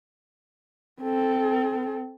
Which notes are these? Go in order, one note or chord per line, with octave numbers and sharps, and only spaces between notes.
C4 A4